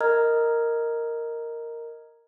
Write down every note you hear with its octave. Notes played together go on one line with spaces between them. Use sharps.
A#4 D#5 A#5 F6 G#6